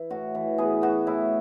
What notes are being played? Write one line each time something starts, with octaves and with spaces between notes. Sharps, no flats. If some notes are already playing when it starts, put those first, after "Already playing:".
Already playing: E3 E4
A2 F#4
E3
B3 G#4
B3 F#4
A2 E4